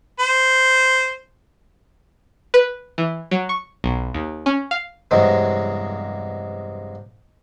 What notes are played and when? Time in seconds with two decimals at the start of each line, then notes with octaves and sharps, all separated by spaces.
0.20 C5
2.54 B4
2.98 E3
3.31 F#3
3.49 C#6
3.84 B1
4.14 D#2
4.46 C#4
4.71 F5
5.11 E2 G2 C3 F#3 G#3 C4